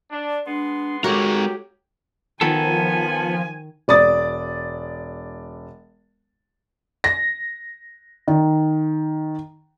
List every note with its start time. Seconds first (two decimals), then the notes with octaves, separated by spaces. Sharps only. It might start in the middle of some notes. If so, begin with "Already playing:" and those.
0.11 D4
0.47 G#3 B3 D4 C6
1.04 G#3 F#4 G4 A4 A#4 C#5 F#5
2.41 D#3 F3 B3 A4 G#5
3.88 E1 D5 D#6 A6
7.04 A#6
8.28 D#3